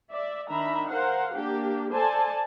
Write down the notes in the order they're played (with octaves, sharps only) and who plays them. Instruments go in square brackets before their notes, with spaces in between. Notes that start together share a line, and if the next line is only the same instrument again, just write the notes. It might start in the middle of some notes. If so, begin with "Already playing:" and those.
[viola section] D5 E5
D#3 D4 E5 A#5 B5
A#4 C5 F5 F#5
A#3 D4 G4
A4 C5 D5 G#5 A5